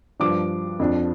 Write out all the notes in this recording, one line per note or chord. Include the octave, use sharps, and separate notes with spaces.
G2 F3 D4 D6
F2 F3 D4